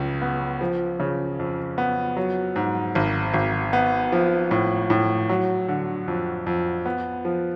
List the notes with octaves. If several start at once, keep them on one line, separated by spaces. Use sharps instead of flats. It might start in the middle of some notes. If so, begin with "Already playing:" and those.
Already playing: C#2 C#3
B3
F3
C#3
F2
B3
F#3
G#2
G#1
G#1
B3
F3
A2
A2
F#3
D3
F2
F2
B3
F3